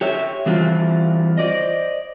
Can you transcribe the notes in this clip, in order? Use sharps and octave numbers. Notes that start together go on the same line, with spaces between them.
G4 C#5 E5
E3 G3 C4 F4 F#4
C5 D5 D#5